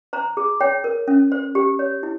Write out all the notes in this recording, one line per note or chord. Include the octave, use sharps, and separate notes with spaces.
C5 A#5
G#4
C#5 G5
A#4
C#4
C5
G4
C#5
E4